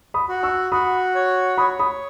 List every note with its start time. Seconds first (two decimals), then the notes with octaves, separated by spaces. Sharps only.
0.14 B5 D#6
0.29 F#4
0.43 C#6 E6
0.72 F#4 B5 D#6
1.15 C#5
1.58 C#5 B5 D#6
1.79 B5 D#6